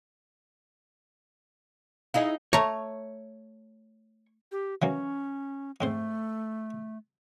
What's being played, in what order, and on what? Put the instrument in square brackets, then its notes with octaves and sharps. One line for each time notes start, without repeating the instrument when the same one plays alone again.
[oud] D#4 E4 G#4 [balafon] D#5 F5
[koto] A3 A#5 [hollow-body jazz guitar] C#5
[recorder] G4
[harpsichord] E3 F#3 A#3 [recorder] C#4
[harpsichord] G#2 C4 C5 [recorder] A3